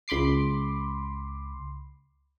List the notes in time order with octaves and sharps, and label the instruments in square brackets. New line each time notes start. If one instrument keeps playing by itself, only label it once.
[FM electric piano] C#2 B5 C6 D6 C7